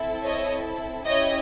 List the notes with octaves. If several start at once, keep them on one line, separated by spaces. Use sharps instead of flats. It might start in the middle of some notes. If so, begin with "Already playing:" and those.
Already playing: C4 E4 A4
C#5 D#5
C#4 E4 G4 C#5 D#5